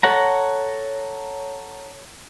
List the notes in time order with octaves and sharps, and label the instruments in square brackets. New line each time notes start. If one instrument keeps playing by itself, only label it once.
[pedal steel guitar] A4 C#5 F#5 A#5